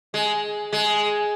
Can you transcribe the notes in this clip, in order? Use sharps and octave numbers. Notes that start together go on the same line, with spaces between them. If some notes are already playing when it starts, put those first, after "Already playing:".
G#3
G#3